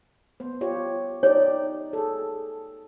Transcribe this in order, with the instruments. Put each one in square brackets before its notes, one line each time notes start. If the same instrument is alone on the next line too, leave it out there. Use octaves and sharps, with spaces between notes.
[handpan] B3 C5
F4 G4 C#5
[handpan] D#4 G4 D5 [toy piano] C#5
[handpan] G#4 A4